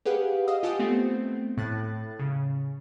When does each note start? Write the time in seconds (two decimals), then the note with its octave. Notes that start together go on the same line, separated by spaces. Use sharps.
0.05 G4 G#4 B4 F5 F#5
0.48 D#5 F5 D#6 E6
0.63 F4 G4 F#5 G#5 A5 D#6
0.79 A3 B3 C4
1.58 A2 F#6 A6
2.19 C#3